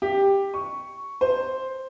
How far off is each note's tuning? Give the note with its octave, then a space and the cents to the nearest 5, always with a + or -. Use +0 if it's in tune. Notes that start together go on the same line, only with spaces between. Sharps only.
G4 +10
C#6 +0
C5 +5